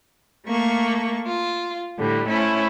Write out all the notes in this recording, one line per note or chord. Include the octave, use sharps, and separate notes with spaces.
A3 A#3 C#6
F4
A2 D3 G3
A3 C#4 E4 C5